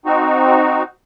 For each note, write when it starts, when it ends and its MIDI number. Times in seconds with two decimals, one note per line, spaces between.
0.06 0.83 60
0.06 0.83 63
0.06 0.83 66